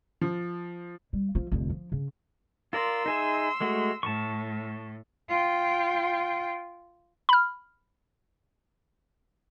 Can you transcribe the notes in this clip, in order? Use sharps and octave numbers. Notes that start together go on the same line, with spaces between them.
F3
G3
F3 F4
F1 D3
F3
C#3
F4 A#4 D5 C6 E6
D#4 G#4 E5
G#3 A3 F#4
A2 A5 C#6
F4 G5
B5 F6